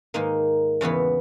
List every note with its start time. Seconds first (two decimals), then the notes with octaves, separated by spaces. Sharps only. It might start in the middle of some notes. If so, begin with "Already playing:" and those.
0.14 G#2 D#3 A#3 D#4
0.81 E2 C#3 E3 B3